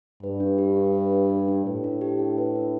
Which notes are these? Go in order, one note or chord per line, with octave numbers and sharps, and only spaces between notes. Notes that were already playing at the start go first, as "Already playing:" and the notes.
G2 B4
D4
G4
D4
B4
D4
G4
D4
A2 B4
D4
G4
D4
B4
D4